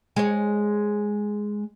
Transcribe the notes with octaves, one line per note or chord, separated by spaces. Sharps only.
G#3 C#5